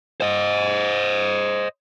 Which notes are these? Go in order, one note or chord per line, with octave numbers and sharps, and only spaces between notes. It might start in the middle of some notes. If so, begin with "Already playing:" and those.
C5 D#5